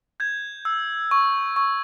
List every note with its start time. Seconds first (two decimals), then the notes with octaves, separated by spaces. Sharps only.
0.20 G6 G#6
0.65 E6
1.11 C#6
1.56 C#6